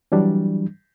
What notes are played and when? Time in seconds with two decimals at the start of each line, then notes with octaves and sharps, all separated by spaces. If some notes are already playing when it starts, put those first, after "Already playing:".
0.12 E3 F#3 G3 D4